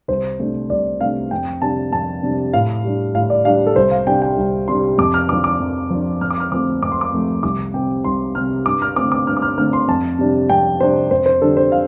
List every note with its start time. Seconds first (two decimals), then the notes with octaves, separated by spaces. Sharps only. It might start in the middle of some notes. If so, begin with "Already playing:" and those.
0.08 C2 C5
0.39 C3 A3 D4
0.70 C2 D5
1.01 C3 A3 D4 F5
1.31 F2 G5
1.62 C3 G3 D4 A5
1.92 F2 A5
2.23 C3 G3 D4
2.53 A2 F5
2.84 G3 D4
3.15 A2 F5
3.30 D5
3.45 G3 D4 F5
3.66 A4
3.76 C2 C5
3.91 F5
4.07 C3 G3 D4 G5
4.22 G5
4.37 C2
4.68 C3 G3 D4 C6
4.98 F2 D6
5.14 F6
5.29 F3 D4 D6
5.44 D6
5.60 F2
5.90 F3 D4
6.21 F2 F6
6.30 D6
6.40 F6
6.52 F3 A3 C4 D6
6.82 F2 D6
6.92 C6
7.01 D6
7.13 F3 A3 C4
7.43 C2 D6
7.74 C3 G3 C4 G5
8.04 C2 C6
8.35 C3 G3 C4 F6
8.66 G2 D6
8.82 F6
8.96 D3 A3 C4 D6
9.12 D6
9.27 G2 F6
9.37 D6
9.42 F6
9.58 D3 A3 C4 F6
9.73 C6
9.89 F2 A5
10.19 C3 G3 D4
10.49 F2 G5
10.80 C3 G3 D4 C5
11.11 F2 C5
11.26 C5
11.42 D3 G3 D4 A4
11.57 C5
11.72 F5